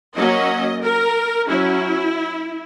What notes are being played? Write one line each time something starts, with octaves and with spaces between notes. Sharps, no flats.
F#3 A#3 C#4 D#5
A#4
F#3 C#4 E4